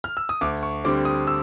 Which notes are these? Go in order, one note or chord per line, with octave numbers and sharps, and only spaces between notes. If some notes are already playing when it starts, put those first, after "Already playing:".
F6
E6
D#6
D2 D6
C#6
D3 G3 C4 D6
D#6
E6